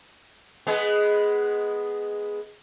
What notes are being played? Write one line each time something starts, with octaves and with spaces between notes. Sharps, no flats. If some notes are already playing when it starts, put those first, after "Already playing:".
G#3 B3